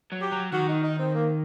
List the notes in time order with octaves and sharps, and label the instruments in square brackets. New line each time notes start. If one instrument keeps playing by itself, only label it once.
[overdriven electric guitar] F#3
[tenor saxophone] G4
[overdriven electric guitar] F#3
[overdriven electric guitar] D#3 [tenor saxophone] F#4
[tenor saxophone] D#4
D#4
C4
A#3